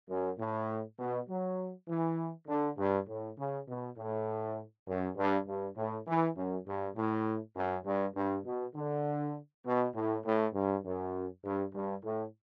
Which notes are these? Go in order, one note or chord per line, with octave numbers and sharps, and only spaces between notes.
F#2
A2
B2
F#3
E3
D3
G2
A2
C#3
B2
A2
F#2
G2
G2
A2
E3
F#2
G2
A2
F#2
G2
G2
B2
D3
B2
A2
A2
G2
F#2
G2
G2
A2